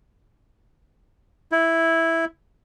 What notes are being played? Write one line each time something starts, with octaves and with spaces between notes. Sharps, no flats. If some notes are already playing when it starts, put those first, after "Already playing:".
E4